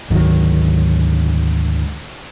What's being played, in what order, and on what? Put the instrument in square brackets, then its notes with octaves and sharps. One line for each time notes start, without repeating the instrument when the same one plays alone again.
[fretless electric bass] D2 G#2 D#3 F#3